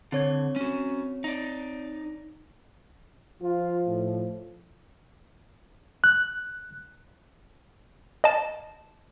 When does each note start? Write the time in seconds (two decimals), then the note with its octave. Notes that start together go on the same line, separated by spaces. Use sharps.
0.12 D3 C4 C#5 G#6
0.56 C#4 F#4
1.24 D#4 D5
3.42 F3 F4
3.88 A2
6.04 F#6
8.24 D#5 A5